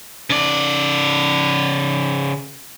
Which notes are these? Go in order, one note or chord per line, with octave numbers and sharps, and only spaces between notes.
C#3 D5